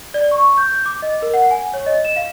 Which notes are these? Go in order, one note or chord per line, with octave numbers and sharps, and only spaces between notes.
D5
C#6
G6
D6
D#5
A#4
F#5
G#5
C#5
D#5
E7
F5